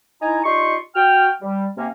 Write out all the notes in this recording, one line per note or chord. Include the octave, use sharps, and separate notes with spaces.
D#4 E4 G#5 A#5
D4 D#4 F4 G4 C6 C#6
F#4 G5 F6
G3
C3 A#3 C#4